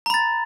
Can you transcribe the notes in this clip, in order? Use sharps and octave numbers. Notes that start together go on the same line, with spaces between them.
A#5 B5 A6